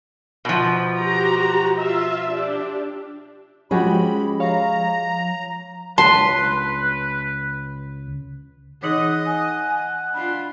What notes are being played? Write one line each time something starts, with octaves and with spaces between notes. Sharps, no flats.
B2 F3
F#4 G4 A#5
F4 E5
D4 G4
F3 G#3 C#4 F#4 G4 B5
C#5 F5 A#5
C#2 B4 A5 C6
E3 D#4 G#4 D#5 F#5 D#6
F#5 G#5
D4 F4 B5